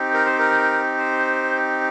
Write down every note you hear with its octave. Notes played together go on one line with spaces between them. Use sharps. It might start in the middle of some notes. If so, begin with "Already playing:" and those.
Already playing: C4 D#4 G4
A#4
C5
A#4
C5